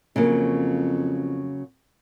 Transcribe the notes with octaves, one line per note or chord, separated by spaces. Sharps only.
F2 C#3 F#3 A#3